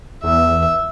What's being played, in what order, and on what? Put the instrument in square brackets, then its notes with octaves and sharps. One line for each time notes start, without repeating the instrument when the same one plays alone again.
[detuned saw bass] E2 [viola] E5